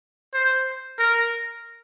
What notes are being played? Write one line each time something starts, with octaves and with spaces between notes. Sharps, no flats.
C5
A#4